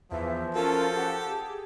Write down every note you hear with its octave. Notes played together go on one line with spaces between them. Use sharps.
E2 E3 F3 E5
C#4 F4 F#4 A4 A#4
G4 F#5
G#4